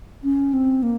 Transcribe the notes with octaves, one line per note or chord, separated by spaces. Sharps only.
C#4
C4
A#3